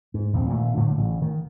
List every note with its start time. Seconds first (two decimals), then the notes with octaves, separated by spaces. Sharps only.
0.14 G#2
0.33 A#1 D#2 D#3 C4
0.49 A#2 D#3 A3
0.76 A2 D3 F#3 A3
0.98 A1 C#3
1.22 D#3